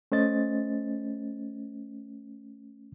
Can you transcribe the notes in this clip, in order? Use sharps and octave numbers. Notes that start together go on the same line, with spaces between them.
A3 C#4 C5 D#5 A6